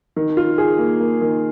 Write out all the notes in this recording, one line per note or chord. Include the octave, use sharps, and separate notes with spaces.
D#3
F4
G#4
A#3
A#3
D#3